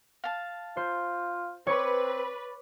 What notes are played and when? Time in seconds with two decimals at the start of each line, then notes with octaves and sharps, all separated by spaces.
0.24 F5 A5
0.77 F4 C5
1.67 C4 B4 C#5 D5 C#6